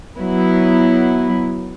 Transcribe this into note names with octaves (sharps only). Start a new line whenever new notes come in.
F#3 B3 E4